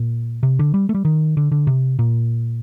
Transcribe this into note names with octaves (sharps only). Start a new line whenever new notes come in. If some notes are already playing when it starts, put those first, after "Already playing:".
Already playing: A#2
C3
D3
G3
A3
G3
D#3
D3
D3
C3
A#2